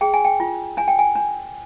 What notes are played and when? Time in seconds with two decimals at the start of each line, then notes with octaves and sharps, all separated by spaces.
0.01 G#4 G5
0.14 G#5
0.25 G5
0.40 F4
0.77 D4 G#5
0.88 G5
0.99 G#5
1.15 D4